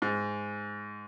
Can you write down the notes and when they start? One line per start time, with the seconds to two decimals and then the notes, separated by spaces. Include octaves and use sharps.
0.02 G#2